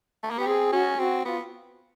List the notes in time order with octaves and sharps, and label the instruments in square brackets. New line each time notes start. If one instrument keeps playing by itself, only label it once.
[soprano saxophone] A3
A#3
[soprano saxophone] B3 [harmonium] G4
[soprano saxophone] C4 [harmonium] G#4
[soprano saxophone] C#4 [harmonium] F#4
[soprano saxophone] C4 [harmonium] F#4
[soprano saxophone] B3 [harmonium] F4